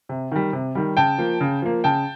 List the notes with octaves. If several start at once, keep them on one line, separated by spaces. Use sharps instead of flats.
C3
D#3 G3
C3
D#3 G3
C#3 G5 A5
F3 A#3
C#3
F3 A#3
C#3 G5 A5